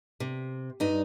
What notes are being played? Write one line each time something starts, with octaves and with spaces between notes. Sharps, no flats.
C3
G2 D#4